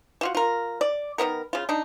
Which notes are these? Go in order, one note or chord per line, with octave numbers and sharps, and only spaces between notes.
E3 F4 F#4
F4 A#4
D5
D#3 F#3 B3 A#4
C#3 F4
D4 D#4